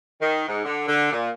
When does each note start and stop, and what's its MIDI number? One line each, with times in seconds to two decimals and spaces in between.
0.21 0.46 51
0.48 0.65 44
0.65 0.86 50
0.88 1.11 50
1.13 1.29 46